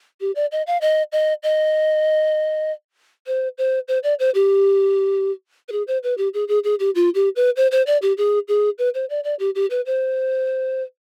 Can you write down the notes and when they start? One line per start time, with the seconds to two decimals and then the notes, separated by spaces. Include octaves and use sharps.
0.21 G4
0.35 D5
0.52 D#5
0.67 F5
0.81 D#5
1.12 D#5
1.43 D#5
3.27 C5
3.58 C5
3.88 C5
4.03 D5
4.19 C5
4.35 G4
5.68 B4
5.72 G#4
5.87 C5
6.03 B4
6.18 G4
6.34 G#4
6.48 G#4
6.64 G#4
6.80 G4
6.95 F4
7.15 G4
7.36 B4
7.57 C5
7.72 C5
7.87 D5
8.02 G4
8.18 G#4
8.48 G#4
8.79 B4
8.95 C5
9.10 D5
9.24 D5
9.39 G4
9.55 G4
9.70 B4
9.86 C5